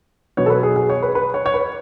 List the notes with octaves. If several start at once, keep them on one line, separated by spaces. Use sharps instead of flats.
B2 F#3 B3 C#5
A4
B4
G#4
G#4
C#5
B4
B4
C#5
C#5
B4